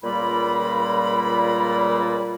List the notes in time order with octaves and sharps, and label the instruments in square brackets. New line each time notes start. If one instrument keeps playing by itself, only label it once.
[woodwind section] C#2 A#2 G3 A#3 F4 B5